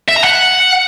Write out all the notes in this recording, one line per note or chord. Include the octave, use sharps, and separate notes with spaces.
E5
A#5
F#5